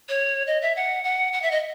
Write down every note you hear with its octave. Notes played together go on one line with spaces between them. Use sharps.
C#5
D#5
E5
F#5
F#5
F#5
E5
D#5